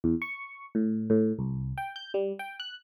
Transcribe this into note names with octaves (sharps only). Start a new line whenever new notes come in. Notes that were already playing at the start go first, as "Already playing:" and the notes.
E2
C#6
A2
A2
C2
G5
G6
G3
G5
F#6